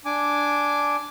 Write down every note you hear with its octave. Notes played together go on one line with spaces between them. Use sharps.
D4 G#5 D6